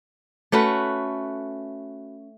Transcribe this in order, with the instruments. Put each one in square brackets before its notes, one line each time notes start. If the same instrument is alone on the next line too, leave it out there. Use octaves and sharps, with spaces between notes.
[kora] A3 C#4 F#4 B4